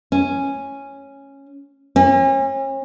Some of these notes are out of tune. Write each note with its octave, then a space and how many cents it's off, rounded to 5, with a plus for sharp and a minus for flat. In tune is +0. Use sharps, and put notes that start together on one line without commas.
C#4 -5
C#4 -40